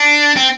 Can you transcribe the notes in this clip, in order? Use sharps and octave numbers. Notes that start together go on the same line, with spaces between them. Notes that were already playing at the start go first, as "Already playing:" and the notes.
Already playing: D4
C4